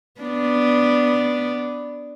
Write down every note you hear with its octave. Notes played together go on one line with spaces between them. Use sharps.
B3 D4